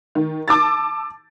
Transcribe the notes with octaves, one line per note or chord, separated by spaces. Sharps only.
D#3
A5 D6 E6 A6